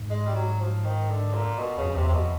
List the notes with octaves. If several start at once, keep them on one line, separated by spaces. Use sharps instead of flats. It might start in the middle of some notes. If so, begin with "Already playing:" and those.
Already playing: G#2
G#3
G3
F#3
F3
D#3
D3
A#2
B2
F2 C#3
E2 C3
C3
F2 B2